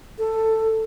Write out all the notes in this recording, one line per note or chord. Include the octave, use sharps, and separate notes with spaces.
A4